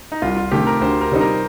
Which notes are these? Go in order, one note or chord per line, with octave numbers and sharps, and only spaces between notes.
D#4
C2 F4
F4
C3 D#3 A3 G4
A#4
D2 C5
A#4
C3 G3 C4 D#4
A#4